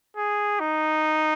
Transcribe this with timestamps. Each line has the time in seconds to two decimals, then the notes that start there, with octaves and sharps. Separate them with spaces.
0.17 G#4
0.60 D#4